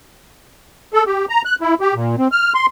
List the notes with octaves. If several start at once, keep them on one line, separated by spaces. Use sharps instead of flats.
A4
G4
A#5
F#6
E4
G4
A#2
C4
F6
C6